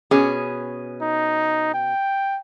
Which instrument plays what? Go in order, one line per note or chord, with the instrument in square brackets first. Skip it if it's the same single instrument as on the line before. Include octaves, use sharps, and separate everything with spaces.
[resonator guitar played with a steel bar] B2 C#4 G#4
[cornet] D#4
G5